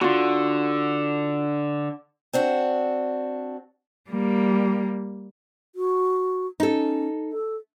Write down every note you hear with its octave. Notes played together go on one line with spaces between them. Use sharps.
D3 F4 F#4
C4 D4 F#4
G3 A#3
F#4
C#4 D#4 A4
A4